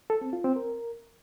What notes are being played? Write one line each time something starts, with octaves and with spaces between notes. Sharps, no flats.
A4
C4
F4
C4
A#4